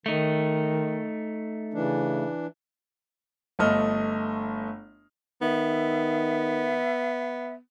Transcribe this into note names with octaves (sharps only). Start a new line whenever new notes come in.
D#3 A3 D#4
C#3 E3 D4
G1 A3 D#5 F6
D#3 B3 E5